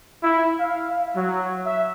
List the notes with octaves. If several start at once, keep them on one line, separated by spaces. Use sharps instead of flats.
E4
F5
F#3
E5